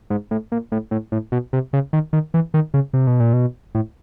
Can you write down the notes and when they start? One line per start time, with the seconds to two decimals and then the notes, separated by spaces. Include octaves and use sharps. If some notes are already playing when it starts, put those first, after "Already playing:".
0.10 G#2
0.31 A2
0.52 A#2
0.72 A2
0.91 A2
1.12 A2
1.32 B2
1.53 C3
1.73 C#3
1.93 D#3
2.13 D#3
2.34 E3
2.54 D#3
2.74 C#3
2.93 C3
3.07 B2
3.20 A#2
3.33 B2
3.75 A2